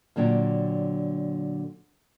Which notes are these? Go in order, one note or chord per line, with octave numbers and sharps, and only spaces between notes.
A#2 D3 F#3 D4 G5